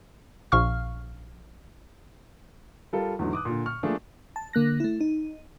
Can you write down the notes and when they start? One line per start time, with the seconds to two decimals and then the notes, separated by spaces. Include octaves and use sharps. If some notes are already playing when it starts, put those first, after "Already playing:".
0.52 A#1 A#2 F5 C#6 F6
2.93 G3 F4 A4 A#4
3.19 E2 G#2 D3 F#3
3.33 D6 D#6 F#6
3.45 A#2 D3
3.66 C#6 F6
3.83 F3 A3 A#3 D4 F4 G#4
4.36 A5
4.53 D3 A#3 F#6 A#6
4.80 A3 E4
5.01 D#4